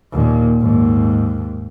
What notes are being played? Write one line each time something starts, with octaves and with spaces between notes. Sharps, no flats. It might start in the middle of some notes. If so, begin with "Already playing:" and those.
D#2 A#2
D#2 G#2